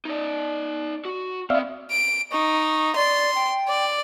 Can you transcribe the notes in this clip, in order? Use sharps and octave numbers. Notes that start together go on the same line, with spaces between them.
D#4 D5
F#4
C4 D5 E5 F5 B5
D7
D#4 C#6
D5 C6
G5
D5